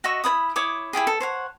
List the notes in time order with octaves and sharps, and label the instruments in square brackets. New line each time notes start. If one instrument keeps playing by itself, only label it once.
[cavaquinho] F#4 D#5 E5 C#6
E4 C#5 B5 D#6
E4 C#5 D6 D#6
E4 F4 G4 G#4
A4
C5 C#5 F#5